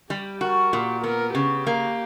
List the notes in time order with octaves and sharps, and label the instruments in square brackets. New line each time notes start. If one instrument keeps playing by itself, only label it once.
[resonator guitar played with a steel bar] G3 [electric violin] G4
[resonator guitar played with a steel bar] F#4 [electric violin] A#4
[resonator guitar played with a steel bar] A#2 [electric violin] G4
[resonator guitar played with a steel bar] B3 [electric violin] A#4
[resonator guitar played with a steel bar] C#3 [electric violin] G4
[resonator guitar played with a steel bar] A#3